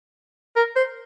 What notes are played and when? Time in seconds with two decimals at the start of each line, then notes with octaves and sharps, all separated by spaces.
0.56 A#4
0.76 C5